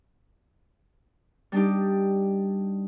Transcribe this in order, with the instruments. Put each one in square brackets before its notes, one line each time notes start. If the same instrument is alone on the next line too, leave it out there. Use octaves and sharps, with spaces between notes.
[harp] G3 D4 D#4 G4